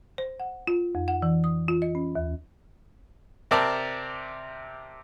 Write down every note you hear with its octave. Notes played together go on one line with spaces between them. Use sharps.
C5
F#5
F4
F2
F#5
E3
D#6
F4
D#5
C#4
D#2
C3 C4 A#4 D5 A5